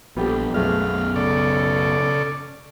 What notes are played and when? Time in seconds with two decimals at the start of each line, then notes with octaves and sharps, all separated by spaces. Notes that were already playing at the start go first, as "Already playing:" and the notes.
0.16 A#1 G3 B3 G4 A4
0.54 B1 F#2 G#3 A3 F5
1.16 C#3 A4 D5